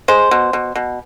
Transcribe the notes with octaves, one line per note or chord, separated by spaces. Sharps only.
G#3 C5
B2
B2
B2